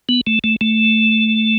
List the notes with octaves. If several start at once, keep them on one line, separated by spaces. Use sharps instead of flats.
B3
A3
A3
A3